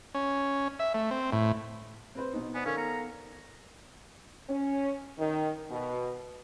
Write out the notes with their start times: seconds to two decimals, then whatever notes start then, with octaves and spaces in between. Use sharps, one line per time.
0.14 C#4
0.79 E5
0.94 A3
1.11 C4
1.33 A2
2.15 C4 B4 C5
2.33 B2 D#4
2.54 B3 C5 D5 G#5
2.66 D#3 C#4 A4 A#4 F5
2.77 B3 A#5 C#7
4.49 C#4
5.19 D#3
5.70 B2